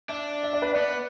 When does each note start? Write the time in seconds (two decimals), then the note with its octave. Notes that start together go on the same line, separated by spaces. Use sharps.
0.09 D4 E5
0.43 E5
0.53 D5
0.62 B4
0.73 B3 D5